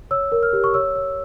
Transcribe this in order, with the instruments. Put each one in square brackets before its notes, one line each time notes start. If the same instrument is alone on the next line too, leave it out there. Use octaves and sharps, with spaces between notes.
[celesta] C#5 E6
A#4
F6
G4
C#6
C#5 E6
C#5